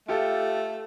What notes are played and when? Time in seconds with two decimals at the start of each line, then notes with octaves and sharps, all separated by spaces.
0.08 A3 F4 G4 A4